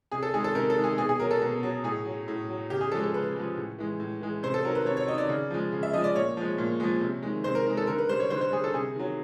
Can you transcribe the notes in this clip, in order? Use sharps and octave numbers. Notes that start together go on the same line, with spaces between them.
C3 G#4
A4
D#3 G#3 G#4
A4
C3 A#4
A4
D#3 G#3
G#4
B2 G#4
G#4
F#3 A#4
A4
B2
F#3
A2 G#4
F#3
A2
F#3
C#3 G4
G#4
F3 G#3 A4
A4
C#3 B4
F3 G#3
A2
E3 G#3
A2
E3 G#3
C3 C5
A4
D#3 F#3 A#4
B4
C3 C#5
C#5
D#3 F#3 D#5
D5
C#3
F3 G#3
C#3
E5
F3 G#3 D#5
D5
A#2 C#5
F3 G#3
A#2
F3 G#3
C3
D#3 G#3
C3 C5
A#4
D#3 G#3 A#4
A4
D3 A#4
B4
G3 C5
C#5
D3 C5
C5
G3 G#4
A4
C3 G#4
D#3 F#3